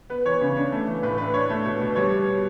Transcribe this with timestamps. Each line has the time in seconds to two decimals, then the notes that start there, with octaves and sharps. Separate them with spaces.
0.10 B3 B4
0.25 E3 C#5
0.41 C#3
0.56 D4
0.72 A3
0.87 E3
1.03 A2 B4
1.18 D4 B4
1.34 D4 C#5
1.50 A3
1.65 B2
1.81 B2
1.96 G3 C#5
2.12 B2